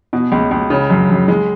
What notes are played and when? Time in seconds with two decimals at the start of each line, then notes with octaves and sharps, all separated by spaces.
0.13 B2
0.32 C#2
0.51 C#2
0.70 C#3
0.90 F#2
1.09 F#2
1.28 G#3